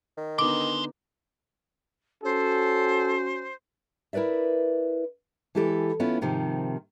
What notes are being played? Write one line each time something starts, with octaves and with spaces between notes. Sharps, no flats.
D#3
D3 B3 D#4 D#5 C6 D6
C#4 F#4 A4 C5
E4 A#4 B4 D5 E5
E3 G#3 E4 G4 A4
B3 C#4 E4 F4
G#2 C3 D#3 F3